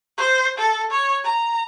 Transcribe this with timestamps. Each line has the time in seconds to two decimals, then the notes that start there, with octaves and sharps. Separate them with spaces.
0.18 C5
0.58 A4
0.91 C#5
1.24 A#5